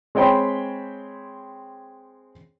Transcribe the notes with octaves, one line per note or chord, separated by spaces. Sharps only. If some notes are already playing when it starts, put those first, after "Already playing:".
G#3 C4 C#5 G5 B5 C6